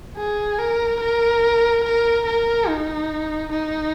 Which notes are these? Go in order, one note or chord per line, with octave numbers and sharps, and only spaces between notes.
G#4
A#4
A#4
A#4
A#4
D#4
D#4